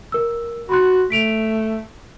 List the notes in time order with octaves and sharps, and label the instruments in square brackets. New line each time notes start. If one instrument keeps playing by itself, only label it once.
[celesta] A#4 E6
[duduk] F#4 [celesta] B5 C6 F#6
[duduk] A3 [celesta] B6 D7 F7